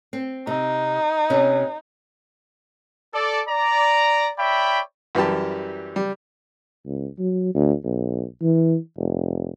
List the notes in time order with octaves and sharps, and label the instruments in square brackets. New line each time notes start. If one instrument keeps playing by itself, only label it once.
[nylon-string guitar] C4
[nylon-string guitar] C3 [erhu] D#4
[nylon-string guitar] C3 B3 C#4
[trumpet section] A4 D5
D5 A#5
C#5 D5 E5 G5 B5
[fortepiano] F#2 E3 G3 G4 A5
G3
[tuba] C#2
F#3
D2
B1
E3
F1